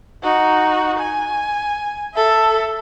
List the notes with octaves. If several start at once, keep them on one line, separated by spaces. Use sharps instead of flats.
D#4 F#4
G#5
A4 E5